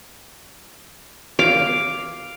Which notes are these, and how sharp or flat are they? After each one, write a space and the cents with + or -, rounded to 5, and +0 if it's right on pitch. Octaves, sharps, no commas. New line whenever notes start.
F5 +0 D6 +0